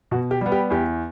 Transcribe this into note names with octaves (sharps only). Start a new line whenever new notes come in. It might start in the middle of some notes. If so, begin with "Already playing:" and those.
B2 F#4
G4
G3 B3
G4
E2 G4